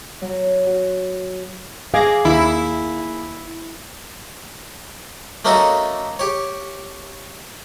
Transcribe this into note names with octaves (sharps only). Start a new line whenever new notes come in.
F#3
F#4
G#4 F5 D6 G#6 A#6
D#2 A#3 E4
A3 A#3 C#4 D#4 F#4 A4
G4 C#5